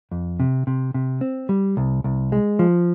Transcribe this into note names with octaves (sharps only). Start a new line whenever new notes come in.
F2
C3
C3
C3
C4
G3
C2
C2
G#3
F3